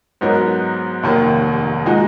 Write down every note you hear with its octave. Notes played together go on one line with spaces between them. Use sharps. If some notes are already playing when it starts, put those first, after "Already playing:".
G#2 F#3 B3 D#4 A#4
F1 D#2 D#3 A#3
A#2 G#3 D#4 F#4